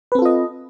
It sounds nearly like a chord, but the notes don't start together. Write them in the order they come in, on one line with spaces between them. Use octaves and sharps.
B4 C4 A4 F4 D#5